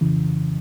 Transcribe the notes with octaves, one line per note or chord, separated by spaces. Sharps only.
F2 C#3 E3